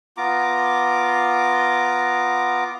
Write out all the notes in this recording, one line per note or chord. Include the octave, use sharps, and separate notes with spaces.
B3 F4 A#5 D6